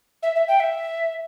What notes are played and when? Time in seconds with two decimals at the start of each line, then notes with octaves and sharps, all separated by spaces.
0.23 E5
0.35 E5
0.48 G5
0.60 E5